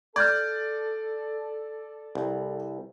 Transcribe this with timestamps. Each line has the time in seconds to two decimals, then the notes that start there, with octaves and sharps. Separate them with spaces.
0.16 A4 D5 F6 G6 G#6
2.15 C2